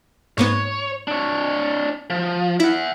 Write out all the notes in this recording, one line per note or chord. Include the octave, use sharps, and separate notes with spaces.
G#2 A#3 B3 C#5
D4 C#5
F3
E4 E5 F#5